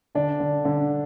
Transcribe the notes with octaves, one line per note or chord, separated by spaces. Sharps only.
D3 D4
D3
D3